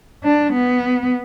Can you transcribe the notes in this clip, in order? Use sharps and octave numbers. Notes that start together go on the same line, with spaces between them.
D4
B3